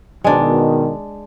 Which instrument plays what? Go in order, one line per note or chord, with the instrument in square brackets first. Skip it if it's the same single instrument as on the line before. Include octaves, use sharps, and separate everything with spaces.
[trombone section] B2 D#3 [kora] G#3 D4